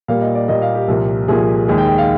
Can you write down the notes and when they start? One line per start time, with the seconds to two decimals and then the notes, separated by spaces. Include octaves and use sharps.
0.08 A#2 G3 A#3 F5
0.22 D#5
0.35 D5
0.48 A#2 G3 A#3 D#5
0.62 F5
0.75 G4
0.88 C2 A#2 F3 A#3
1.28 C2 A#2 F3 A#3 G#4
1.68 D#2 D#3 G#3 G#4
1.78 G5
1.88 G5
1.98 F5